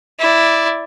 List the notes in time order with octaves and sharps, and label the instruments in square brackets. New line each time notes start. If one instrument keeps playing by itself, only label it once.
[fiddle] E4 D5